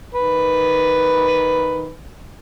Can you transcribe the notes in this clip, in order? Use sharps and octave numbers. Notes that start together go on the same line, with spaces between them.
D#3 B4